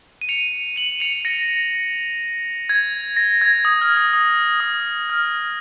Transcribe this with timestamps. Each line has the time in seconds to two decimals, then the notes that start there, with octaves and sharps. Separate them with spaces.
0.21 D#7
0.29 C#7 F7
0.76 D#7 F#7
1.00 C#7 F7
1.25 A#6 C#7
2.69 G#6
3.17 A#6
3.41 G#6
3.65 D#6
3.81 F6
3.97 D#6
4.13 D#6
4.60 D#6
5.09 F6